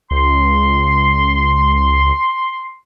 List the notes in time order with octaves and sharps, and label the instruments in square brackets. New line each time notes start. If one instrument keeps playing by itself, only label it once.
[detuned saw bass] C#2 [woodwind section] C6